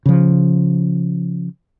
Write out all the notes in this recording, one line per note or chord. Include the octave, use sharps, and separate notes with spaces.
C#3 F3